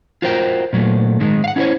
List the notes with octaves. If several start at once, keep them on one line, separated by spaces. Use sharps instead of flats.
F4 F#4 A#4 C5 C#5 G5
A#2 F#3 A3
G#2 D#3 G#3
F5 F#5
C#4 E4 G#4 C5 C#5